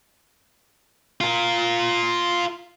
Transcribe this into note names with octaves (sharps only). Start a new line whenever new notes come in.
F4 A#4